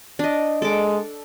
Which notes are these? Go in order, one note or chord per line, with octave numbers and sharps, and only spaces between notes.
D4 D#5
G#3 A4 D6